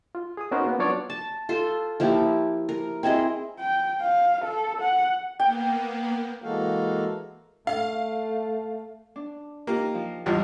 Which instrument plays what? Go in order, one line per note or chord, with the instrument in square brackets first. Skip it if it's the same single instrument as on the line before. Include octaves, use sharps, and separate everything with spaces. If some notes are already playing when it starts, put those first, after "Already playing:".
[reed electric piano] F4
G#4 D#6
B3 C#4 D#4 F#4 A#4 C5
A#3 B3
F#3 B3 D4 F4 C#5 D5
[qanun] A5
F4 A4 C5
F3 A#3 E4 G4
A#4
C4 E4 G#4 D#5
[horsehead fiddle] G5
F5
A4
F#5
[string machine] A#3 B3 [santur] G5
[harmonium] E3 G#3 A#3 F#4 A4 F5
[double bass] A3 [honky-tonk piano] F5
[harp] D4
[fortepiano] A#3 [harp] D#4 F4 G4
[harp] F3
[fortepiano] G#1 E2 F3 [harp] G3